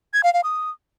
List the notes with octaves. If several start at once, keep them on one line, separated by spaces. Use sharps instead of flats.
G#6
F5
F5
D#6